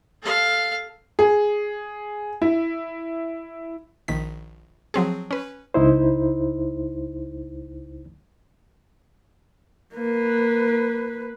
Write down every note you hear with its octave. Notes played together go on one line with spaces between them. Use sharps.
A4 F5
G#4
E4
A#1 D#3 B6
F3 F#3 C4 G#4
C#4 B4
C#2 D#4 E4 C5
A#3 B4